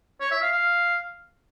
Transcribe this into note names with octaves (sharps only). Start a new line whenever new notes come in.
C#5
E5
F5
F5